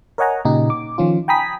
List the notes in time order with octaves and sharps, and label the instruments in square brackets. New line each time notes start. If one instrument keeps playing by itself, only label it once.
[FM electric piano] A#4 C#5 D#5 F#5 G#5 A#5
A#2 C#3 D#4 G4
D6
D#3 F3 C#4 F4
G5 G#5 A#5 B5 D#6 B6